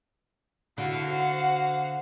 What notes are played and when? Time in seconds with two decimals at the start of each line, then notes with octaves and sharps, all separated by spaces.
0.78 D3 E4 F#4 A4 F5
1.07 C5 F#5